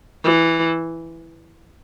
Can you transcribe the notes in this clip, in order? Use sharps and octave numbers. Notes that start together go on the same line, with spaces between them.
E3